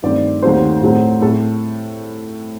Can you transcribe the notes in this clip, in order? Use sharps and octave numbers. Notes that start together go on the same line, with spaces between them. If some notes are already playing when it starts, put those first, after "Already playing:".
G2 D#3 A3 C4 D5
D#2 D#3 F#3 A3 C4 C5
A2 F#3 A3 C4
A2 A3 C4 A4